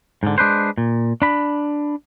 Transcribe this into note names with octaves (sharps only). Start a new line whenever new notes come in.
G#2 D3
G#3 D4 B4 C5
A#2
D4 B5